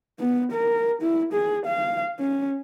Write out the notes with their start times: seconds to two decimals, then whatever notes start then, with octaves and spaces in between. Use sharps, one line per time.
0.19 B3
0.52 A#4
1.02 E4
1.33 G#4
1.66 F5
2.19 C#4